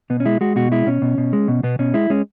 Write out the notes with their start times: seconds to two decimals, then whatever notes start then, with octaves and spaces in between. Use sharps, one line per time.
0.10 B2 B3
0.20 C#4
0.26 G#3 E4
0.41 G#3 F#4
0.56 B2 F#4
0.72 G#3 E4
0.86 B2 C#4
1.02 B2
1.18 B2
1.33 G#3
1.48 B2
1.63 B2 B3
1.79 B2 C#4
1.94 G#3 E4
2.10 G#3 C#4